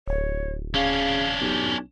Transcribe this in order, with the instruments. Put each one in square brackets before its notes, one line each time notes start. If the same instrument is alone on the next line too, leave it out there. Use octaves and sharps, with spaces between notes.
[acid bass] D1 [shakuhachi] C#5
[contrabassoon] C#3 [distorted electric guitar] C#4 D4 [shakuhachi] F5
[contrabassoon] B1 [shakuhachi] G4